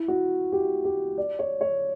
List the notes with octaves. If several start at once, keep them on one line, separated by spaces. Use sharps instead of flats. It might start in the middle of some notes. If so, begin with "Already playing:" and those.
Already playing: E4
F#4
G4
G4
D5
C#5
C#5